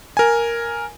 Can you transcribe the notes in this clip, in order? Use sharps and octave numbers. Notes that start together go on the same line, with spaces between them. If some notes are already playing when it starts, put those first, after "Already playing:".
A#4 G#5